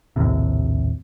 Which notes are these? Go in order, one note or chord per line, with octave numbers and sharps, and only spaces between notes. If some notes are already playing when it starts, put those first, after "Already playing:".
A#1 D#2 A2 C3